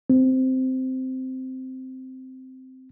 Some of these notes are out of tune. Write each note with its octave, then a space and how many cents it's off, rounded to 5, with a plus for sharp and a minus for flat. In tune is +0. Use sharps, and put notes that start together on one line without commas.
C4 -10